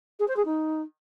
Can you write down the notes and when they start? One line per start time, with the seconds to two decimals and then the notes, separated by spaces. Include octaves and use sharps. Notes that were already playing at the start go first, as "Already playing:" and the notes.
0.19 G#4
0.28 C5
0.36 G#4
0.45 D#4